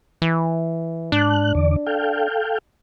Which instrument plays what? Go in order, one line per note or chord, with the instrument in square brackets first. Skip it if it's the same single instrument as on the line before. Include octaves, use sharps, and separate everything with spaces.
[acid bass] E3
[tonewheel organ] G#2 F#6 [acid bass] D4
[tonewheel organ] E2 D3 D5
A4 F5 G5